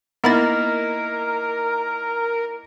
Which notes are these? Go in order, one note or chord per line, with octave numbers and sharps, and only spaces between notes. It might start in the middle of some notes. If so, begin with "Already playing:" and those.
A#3 B3 D#4 E4 A#4 B5 A6